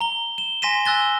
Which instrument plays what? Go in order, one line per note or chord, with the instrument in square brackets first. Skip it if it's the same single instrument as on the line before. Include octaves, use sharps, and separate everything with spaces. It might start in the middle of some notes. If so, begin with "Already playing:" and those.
[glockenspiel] A#5 G7
E7 G7
G#5 C6 A#6 B6 D#7 E7
G#5 E6 F#6 A6 G7